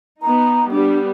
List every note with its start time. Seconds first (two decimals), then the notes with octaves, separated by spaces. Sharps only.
0.22 B3 D#4 A#5
0.71 G3 B3 D4